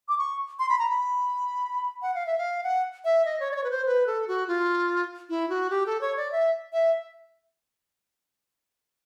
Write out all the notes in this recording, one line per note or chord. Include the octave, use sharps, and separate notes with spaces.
D6
C#6
C6
B5
A#5
B5
F#5
F5
E5
F5
F#5
E5
D#5
C#5
D5
C#5
B4
C5
B4
A4
F#4
F4
E4
F#4
G4
A4
C#5
D5
E5
E5